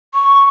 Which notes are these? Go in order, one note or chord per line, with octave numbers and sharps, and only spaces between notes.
C#6